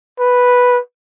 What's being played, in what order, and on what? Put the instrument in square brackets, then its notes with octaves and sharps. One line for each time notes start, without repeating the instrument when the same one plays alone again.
[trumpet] B4